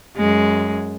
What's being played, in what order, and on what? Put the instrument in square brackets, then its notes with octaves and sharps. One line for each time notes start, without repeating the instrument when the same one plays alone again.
[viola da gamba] F#2 G#3